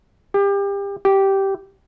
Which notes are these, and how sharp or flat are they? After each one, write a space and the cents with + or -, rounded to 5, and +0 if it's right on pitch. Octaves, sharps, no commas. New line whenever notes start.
G4 +30
G4 -10